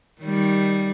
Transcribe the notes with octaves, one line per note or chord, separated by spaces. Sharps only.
D#3 G3